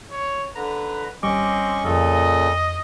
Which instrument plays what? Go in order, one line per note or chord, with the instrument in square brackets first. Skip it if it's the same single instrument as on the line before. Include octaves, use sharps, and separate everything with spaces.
[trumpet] C#5
[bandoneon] D3 A#5 [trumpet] B4
[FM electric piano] G#1 G3 D6 [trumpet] C4 [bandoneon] C#4 D#5 C#6
[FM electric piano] F2 [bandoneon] A#2 C#3 A4 [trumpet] D#5